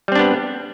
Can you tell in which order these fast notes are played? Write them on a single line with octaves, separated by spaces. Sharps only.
G3 C4 D4 B3